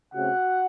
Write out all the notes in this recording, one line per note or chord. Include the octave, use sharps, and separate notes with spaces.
C#3 A3 C4 F#4 F#5